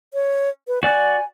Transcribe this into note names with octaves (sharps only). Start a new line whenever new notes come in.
C#5
B4
F#4 D5 G#5 F#6